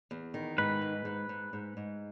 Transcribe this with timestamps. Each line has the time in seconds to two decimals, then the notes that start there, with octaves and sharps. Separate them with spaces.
0.11 E2
0.34 D#3
0.58 G#2 B4
0.81 G#3
1.05 G#2
1.29 G#2
1.53 G#2
1.77 G#2